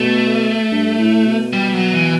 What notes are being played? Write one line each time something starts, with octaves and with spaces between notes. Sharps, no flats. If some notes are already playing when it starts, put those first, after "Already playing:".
Already playing: B2 A3
G2
A2
B2
G3
F#3
E3